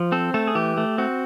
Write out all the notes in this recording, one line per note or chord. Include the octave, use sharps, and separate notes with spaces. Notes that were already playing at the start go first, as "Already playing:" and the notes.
Already playing: F3
C4 A4
A3 A4
G#4
E3 G4
A3
C4 F#4